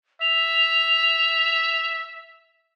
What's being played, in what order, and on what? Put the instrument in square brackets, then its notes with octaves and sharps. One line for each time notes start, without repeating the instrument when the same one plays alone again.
[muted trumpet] E5 [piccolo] F7